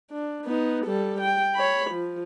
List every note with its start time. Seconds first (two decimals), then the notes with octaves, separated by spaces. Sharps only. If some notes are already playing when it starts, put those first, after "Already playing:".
0.11 D4
0.45 B3 D#4
0.85 G3 A4
1.20 G5
1.55 C#5 B5
1.90 F3